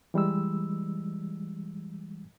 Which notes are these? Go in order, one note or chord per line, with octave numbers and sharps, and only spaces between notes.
E3 G3 G#3 E6